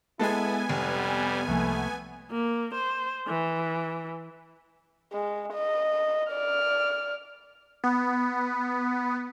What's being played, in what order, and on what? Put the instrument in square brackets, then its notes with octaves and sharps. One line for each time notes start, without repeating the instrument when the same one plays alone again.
[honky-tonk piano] G#3 A4 [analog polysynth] B3 G#5 [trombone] E4
[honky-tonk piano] F1 [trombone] G3
[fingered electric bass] C2 F3 A#3 [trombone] A3
[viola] A#3
C5
E3
[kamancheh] G#3
D#5
D5 F6
[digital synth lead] B3